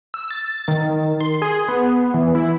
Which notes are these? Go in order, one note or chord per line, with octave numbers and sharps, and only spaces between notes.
E6
A6
D#3
C6
G#4
B3
E3
E4